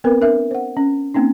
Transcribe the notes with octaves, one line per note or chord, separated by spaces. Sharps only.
B3 C4 A#4 B4
D4 A#4 E5
C5 F#5
C#4
A#3 C4 C#4 D#4